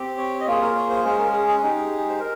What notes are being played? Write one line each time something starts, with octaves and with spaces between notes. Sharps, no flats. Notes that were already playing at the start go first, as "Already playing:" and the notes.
Already playing: C4 G4
C#5
D#5
A#3 F4 G#4 C#5
A#4
C#5
C5
G#3 C#4 G#4 C5
A#4
G#4
G#4
G#3 D#4 G4
C5
A#4